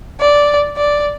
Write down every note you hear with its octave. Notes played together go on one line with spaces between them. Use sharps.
D5
D5